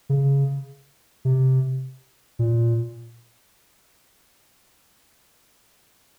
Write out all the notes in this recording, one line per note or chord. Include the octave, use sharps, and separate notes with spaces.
C#3
C3
A#2